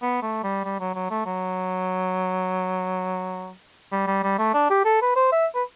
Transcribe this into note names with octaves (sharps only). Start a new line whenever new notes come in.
B3
A3
G3
G3
F#3
F#3
A3
F#3
G3
G3
G3
A3
D4
G4
A4
B4
C5
E5
B4